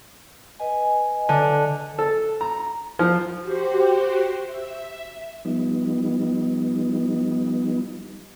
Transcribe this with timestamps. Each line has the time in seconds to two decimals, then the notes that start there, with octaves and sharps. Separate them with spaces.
0.60 B4 D#5 G#5
1.29 D3
1.99 A4
2.41 A#5
2.99 F3
3.42 F#4 G4 C5
4.47 E5
5.45 F3 G3 B3 D#4